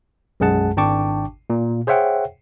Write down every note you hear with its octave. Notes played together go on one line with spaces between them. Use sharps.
B1 F#2 G#3 G#4 F#5 A5
G#1 D4 G5 A5 C#6 D6
A#2
G#4 C5 C#5 E5 F#5 G5